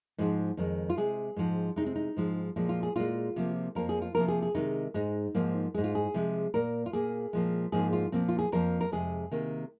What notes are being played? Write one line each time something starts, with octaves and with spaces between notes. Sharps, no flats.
G#2 F3 G#3
F2 D#3 G#3
F4
C3 G#3 G#4
G#2 F3 G#3
C3 G#3 D#4
C4
D#4
G#2 F3 G#3
A#2 F3 G#3
F4
G#4
A#2 G#3 F4
C3 F3 A#3
F2 F3 A#3 A#4
G#4
F4
C3 F3 A#3 A#4
G#4
G#4
C3 D#3 G#3 D#4
G#2 G#3 D#4
G#2 F3 A#3
G#2 G#3 G#4
F4
G#4
C3 F3 G#3
A#2 A#3 A#4
F4
A#2 A#3 G#4
A#2 F3 G#3
G#2 F3 A#3 G#4
F4
A#2 F3 A#3 C4
F4
G#4
F2 F3 A#3 A#4
A#4
F2 C3 G#3 G#4
C3 D#3 A#3